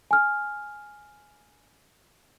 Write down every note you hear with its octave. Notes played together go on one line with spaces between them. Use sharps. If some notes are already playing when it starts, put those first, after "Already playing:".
G#5 F6